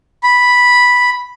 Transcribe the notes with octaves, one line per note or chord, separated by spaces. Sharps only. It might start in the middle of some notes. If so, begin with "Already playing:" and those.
B5